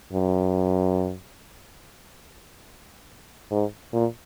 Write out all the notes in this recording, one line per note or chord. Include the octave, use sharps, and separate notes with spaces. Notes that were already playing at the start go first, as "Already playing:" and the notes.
F#2
G#2
A#2